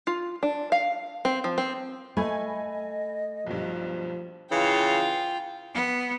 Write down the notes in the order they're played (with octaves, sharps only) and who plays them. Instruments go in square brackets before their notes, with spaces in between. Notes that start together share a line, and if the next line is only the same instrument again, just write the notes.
[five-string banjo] F4
D4
F5
C4
F3
C4
[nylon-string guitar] A3 [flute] D#5 [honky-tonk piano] G#5 B5 G#6
[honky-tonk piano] B1 G2 [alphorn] F3
[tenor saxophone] C#3 [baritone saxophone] E3 [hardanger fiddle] F4 G5
[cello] B3